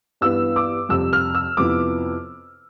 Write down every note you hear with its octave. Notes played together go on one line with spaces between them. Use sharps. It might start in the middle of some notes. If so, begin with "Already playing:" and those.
G2 E3 B3 E6
D6
F2 C3 G3 C4 E6
F6
E6
F2 C3 F3 B3 E4 D6